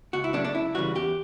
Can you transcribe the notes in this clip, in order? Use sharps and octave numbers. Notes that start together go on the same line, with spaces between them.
C#2 F#4
E4
C#3 F#3 A3 D4
D4
C#2 E4
C#3 E3 G3 F#4
E2 G4